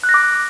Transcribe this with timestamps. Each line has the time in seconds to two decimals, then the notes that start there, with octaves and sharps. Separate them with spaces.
0.03 F#6
0.09 A#6
0.14 D6